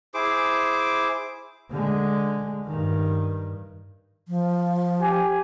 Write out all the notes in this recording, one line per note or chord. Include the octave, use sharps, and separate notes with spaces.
E4 G#4 C5 D6
D3 G#3
G2 D#3
F3
G4 G#5